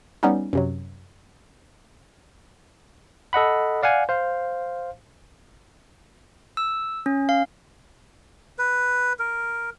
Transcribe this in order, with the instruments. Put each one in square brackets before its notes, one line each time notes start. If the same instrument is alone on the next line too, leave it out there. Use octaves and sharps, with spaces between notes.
[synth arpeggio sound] G3 B3 C#4 D#4
F#2 C3 F#3
[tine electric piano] A4 D#5 F#5 B5
D5 F5 F#5 G#5
C5 F5
[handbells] E6
C#4
F5
[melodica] B4
A#4